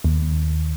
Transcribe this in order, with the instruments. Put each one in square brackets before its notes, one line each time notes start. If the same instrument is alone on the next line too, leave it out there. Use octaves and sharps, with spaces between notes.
[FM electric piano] D#2